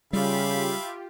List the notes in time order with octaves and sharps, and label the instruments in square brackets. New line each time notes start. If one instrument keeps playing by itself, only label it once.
[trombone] C#3 [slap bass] G3 [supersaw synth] F4 G4 [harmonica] E5 F5 B5